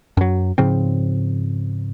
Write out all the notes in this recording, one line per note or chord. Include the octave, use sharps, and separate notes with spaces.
F#2 F#3
G#2 C#3 F3 C4